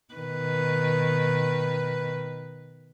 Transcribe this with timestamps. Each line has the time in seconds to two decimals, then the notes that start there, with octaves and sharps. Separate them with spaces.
0.14 B2 D#3 B4